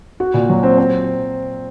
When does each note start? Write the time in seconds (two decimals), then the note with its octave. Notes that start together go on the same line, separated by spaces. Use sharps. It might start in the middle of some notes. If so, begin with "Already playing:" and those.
0.20 F#4
0.34 A#2
0.49 F#3
0.63 C4
0.78 C4